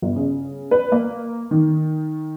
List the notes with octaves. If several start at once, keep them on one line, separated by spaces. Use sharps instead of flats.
G1
C#3
B4
A#3
D#3